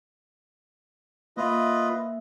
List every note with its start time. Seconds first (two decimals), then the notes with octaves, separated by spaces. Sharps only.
1.37 A#3 F4 B4 D#5 E5